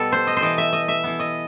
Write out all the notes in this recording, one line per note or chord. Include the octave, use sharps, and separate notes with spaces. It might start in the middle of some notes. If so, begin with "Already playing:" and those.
Already playing: B2 G3 B3 A4
C5
D#5
C5
E3 B3 D#5
E5
D#5
E5
E3 B3
D#5